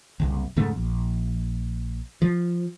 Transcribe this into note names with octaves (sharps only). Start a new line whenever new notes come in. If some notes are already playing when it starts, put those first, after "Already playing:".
F#1 C2
F1 G#2 C#3 A3
A#1
F3